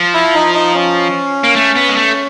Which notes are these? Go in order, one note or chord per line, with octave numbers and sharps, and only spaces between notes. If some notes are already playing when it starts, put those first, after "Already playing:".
Already playing: F3
E4
D#4
D#4
C#4
A#3
A3
B3
G#3
A3